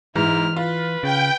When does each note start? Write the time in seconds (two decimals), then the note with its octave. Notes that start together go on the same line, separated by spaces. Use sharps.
0.16 G#2 E3 E4 F6
0.57 F4 B4
1.03 C#3 G5